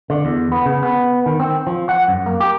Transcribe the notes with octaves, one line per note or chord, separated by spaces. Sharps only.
D3
E2
B3
C#3
B3
D#3
C4
F3
F#5
F#2
A#3
G4